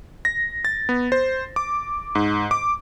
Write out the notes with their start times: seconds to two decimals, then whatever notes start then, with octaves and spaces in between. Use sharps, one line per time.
0.25 A#6
0.65 A6
0.89 B3
1.12 C5
1.56 D6
2.15 G#2
2.51 D6